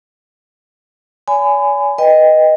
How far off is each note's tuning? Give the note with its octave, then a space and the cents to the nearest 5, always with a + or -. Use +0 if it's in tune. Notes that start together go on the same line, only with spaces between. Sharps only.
C#5 +45 G#5 +0 B5 +35
B4 -15 D#5 +0 G5 +25